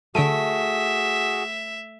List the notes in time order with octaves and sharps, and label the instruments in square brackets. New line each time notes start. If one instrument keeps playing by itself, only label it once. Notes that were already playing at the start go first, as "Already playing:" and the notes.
[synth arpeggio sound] D3 D7 D#7 [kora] A3 [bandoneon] F#4 G#4 [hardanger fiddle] E5